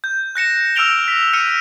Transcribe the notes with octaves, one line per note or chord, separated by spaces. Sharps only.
G6
F#6 A#6 C#7 E7
E6 F6 A#6 D7 F7 G7
A#6 B6
F6 C#7 D#7